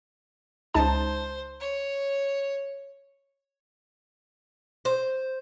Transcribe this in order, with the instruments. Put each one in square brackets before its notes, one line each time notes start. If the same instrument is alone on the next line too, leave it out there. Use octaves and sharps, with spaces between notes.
[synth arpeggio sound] C#2 D#4 A5 [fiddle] C5
[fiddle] C#5
[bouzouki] C5